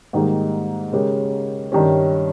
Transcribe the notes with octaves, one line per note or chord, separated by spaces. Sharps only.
G#2 D#3 G3 A#3 D#4
C#3 G#3 C#4 G4 A#4
G2 D#3 G3 C#4